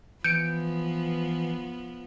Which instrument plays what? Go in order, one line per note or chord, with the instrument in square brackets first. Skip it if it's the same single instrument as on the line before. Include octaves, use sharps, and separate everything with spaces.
[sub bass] E3 [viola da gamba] F3 B3 [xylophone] G6 [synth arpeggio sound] C#7 D7